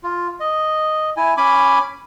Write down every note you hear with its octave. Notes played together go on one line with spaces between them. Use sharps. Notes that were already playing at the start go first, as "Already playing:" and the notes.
F4
D#5
E4 G#5
C#4 G#5 B5 D6